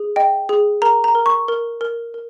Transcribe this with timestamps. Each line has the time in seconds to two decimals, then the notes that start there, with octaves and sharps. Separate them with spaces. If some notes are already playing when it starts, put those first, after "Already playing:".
Already playing: G#4
0.16 D#5 G5
0.49 G#4
0.82 A#4 A#5
1.04 A#5
1.15 A#4
1.26 C#6
1.48 A#4
1.81 A#4
2.14 A#4